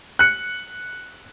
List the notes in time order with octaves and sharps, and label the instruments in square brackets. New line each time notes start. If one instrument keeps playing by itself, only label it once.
[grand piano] F#6 C#7